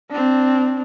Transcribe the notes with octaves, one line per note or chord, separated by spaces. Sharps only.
C4 D4